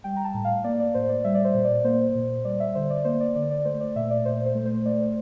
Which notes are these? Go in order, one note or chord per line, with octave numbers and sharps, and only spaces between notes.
G3 G5
A#5
A5
A2
F5
A#3 D5
D5
A2 C5
D5
G3 E5
D5
C5
A#2
D5
A#3 C5
A#2
G3 D5
E5
D3 C5
D5
A#3 C5
D5
D3 D5
D5
A3 C5
D5
A#2 E5
D5
A#2 C5
C5
A3
C5
A3 D5
C5